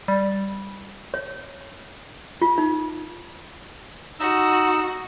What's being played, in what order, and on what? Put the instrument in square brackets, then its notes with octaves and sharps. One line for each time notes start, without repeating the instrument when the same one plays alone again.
[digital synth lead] G3
[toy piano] C#5
F4
D#4
[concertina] D#4 E6 [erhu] F#4